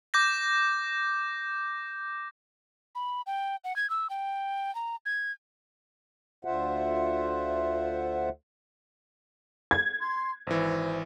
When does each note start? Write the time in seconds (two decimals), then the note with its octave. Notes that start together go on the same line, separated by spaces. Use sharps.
0.14 D6 G6 A#6
2.95 B5
3.27 G5
3.64 F#5
3.76 G#6
3.90 E6
4.10 G5
4.75 A#5
5.06 G#6
6.45 D2 D3 F4 C5 E5 F#5
9.71 G#6
10.00 C6
10.47 G#1 E3 C5